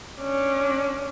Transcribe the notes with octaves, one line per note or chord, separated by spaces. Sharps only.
C#4 D4